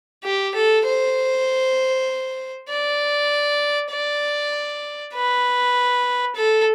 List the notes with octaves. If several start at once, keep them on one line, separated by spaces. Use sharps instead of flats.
G4
A4
C5
D5
D5
B4
A4